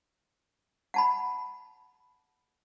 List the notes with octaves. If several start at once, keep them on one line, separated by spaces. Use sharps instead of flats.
F#5 A5 B5